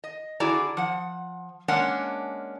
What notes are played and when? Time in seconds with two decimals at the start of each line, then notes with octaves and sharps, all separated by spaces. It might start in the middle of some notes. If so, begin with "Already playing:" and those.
0.04 D#5
0.40 D3 E4 F#4 G#4 D5 A#5
0.77 F3 F#5
1.68 G#3 A#3 C#4 D4 F#5